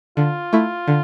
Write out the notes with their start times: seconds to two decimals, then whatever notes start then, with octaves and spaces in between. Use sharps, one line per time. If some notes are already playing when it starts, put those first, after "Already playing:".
0.17 D3 F4
0.53 A3 E4
0.88 D3